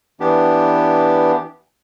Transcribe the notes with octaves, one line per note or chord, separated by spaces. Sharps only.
E3 B3 D4 G4